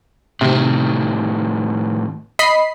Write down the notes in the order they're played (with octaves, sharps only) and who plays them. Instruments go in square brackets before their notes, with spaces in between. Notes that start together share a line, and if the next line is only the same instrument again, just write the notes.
[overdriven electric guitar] A2 D#3 [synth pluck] C3
[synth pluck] D#5 B5 C7